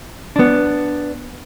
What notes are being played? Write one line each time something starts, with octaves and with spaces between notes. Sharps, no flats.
B3 D4